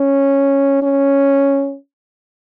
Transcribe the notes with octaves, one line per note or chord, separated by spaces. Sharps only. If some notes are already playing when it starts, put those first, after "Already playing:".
Already playing: C#4
C#4